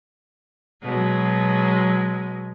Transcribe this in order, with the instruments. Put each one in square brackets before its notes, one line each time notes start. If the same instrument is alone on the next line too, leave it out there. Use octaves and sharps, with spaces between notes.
[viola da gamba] B2 F#3 G#3